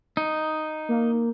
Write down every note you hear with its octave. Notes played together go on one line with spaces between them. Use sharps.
D#4
A#3